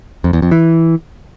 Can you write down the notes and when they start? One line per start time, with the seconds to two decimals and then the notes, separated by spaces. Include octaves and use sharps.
0.24 F2
0.33 E2
0.42 F2
0.51 E3